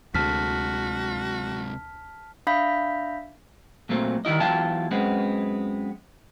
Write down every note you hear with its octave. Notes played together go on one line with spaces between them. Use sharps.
D2 C3 G#3 F#4 A5 F6 B6
D4 E5 F5 B5 G6 B6
A#2 F#3 A3 C4
D#3 G3 E4 D#5
E2 F#3 E4 F4 G5 A5
F#2 G#3 B3 C4